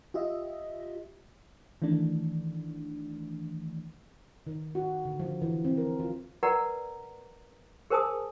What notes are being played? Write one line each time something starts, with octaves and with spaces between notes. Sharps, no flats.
F4 G4 D#5 E5
D#3 E3 A3 D4
D#3
F#4
D3
F3
E3
C4
A#4
F4
A#4 B4 D5 F#5 A#5
G#4 A#4 C5 G#5 A5 D#6